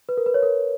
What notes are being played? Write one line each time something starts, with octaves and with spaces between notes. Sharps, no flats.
B4
A#4
B4
C#5
A#4